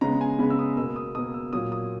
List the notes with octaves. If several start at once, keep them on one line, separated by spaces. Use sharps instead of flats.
C#3 G#3 B3 A#5
G#5
C#3 G#3 B3 B5
E6
D#6
B2 A#3 E6
D#6
B2 A#3 D#6
E6
A#2 F#3 A#3 D#6
D#6